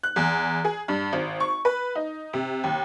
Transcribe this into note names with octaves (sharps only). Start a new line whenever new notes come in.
F#6
E2
G#4
G2
G#1
C#6
B4
D#4
C3
D#2